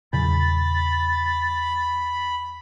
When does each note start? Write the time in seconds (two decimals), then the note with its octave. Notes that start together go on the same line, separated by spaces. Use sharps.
0.13 E2 A#2 C#3 F#3 B5 A6